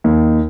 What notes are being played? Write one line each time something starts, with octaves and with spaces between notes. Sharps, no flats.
D#2